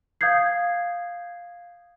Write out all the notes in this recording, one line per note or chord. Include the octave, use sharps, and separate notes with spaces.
F5 D#6 G6 G#6 C7